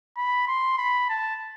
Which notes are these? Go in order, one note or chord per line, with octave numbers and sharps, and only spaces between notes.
B5
C6
B5
A5